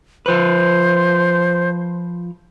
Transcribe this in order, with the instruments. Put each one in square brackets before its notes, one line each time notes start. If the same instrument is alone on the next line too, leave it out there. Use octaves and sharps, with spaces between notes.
[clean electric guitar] F3 B4 [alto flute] C5